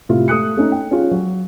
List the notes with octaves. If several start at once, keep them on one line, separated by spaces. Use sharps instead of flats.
A2 C3 E4 F4
A3 D#6 F#6 C#7
A3 C#4 D#4
G5
C#4 F4 G#4
F#3